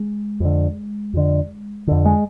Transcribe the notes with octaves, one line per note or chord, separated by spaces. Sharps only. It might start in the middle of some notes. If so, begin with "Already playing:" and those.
Already playing: G#3
F2 D3
F2 D3
F2 D3
G#3